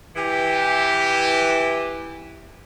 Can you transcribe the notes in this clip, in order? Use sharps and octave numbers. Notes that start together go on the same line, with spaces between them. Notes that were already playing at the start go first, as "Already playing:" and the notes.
E3 G4